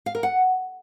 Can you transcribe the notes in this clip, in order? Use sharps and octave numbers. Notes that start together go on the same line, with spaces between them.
F5
A#4
F#5